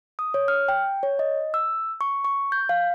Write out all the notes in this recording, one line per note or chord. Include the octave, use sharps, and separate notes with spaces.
D#6
C#5
F6
G5
C#5
D#5
E6
C#6
C#6
G6
F5